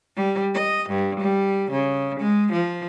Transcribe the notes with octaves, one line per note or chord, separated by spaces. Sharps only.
G3
D#5
G2
G3
C#3
G#3
F3